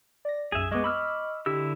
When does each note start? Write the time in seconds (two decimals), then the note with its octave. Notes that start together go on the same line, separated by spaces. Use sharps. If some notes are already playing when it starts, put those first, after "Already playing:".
0.25 D5 A#6
0.52 B1 F#2 G#4 E5
0.71 G#3 B3 D#5 C#6 D6
0.84 B5 E6 F6
1.46 D3 E4 G4 E6